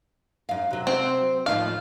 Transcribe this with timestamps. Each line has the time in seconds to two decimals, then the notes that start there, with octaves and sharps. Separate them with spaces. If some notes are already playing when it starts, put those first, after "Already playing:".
0.49 F#2 F5
0.71 C3 F#3
0.87 C4
1.46 D#2 A2 F3 F5